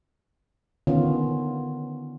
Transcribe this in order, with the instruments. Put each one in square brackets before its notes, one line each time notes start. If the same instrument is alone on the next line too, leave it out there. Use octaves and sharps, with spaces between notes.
[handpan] D3 D#3 B3 C#4 F4